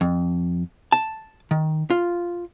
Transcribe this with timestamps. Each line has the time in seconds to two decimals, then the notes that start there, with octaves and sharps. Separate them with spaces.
0.01 F2
0.92 A5
1.51 D#3
1.90 F4